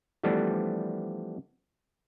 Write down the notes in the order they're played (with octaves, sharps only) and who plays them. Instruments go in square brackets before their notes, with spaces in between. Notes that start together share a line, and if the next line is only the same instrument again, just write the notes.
[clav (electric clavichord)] E3 F3 G3 A3 B3 D4